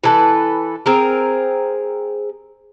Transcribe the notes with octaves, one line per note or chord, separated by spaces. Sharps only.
E3 A4 B4
C4 G#4 A#4